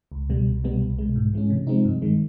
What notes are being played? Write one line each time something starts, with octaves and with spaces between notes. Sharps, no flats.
C#2
B2 G3
C2
B2 G3 B3
C2
B2 G#3
G#2
E3 G#3 C#4
C3
F3 G#3 C4 D#4
G2
D#3 G#3